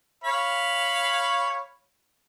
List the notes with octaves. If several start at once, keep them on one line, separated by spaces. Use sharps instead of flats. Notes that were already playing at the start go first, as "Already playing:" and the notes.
C#5 F5 B5